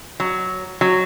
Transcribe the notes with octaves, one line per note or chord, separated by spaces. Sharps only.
F#3
F#3